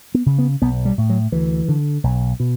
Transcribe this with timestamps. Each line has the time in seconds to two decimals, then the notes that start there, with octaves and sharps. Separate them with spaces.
0.14 B3
0.26 C#3
0.38 B3
0.61 B1 B3
0.85 G3
0.98 A2
1.10 F#3
1.32 D2 E3
1.68 D3
2.04 B1
2.40 B2